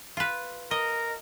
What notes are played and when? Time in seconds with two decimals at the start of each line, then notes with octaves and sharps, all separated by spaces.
0.17 F4 B4
0.71 A#4 D#5